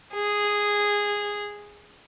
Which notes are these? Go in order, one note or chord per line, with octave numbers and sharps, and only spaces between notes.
G#4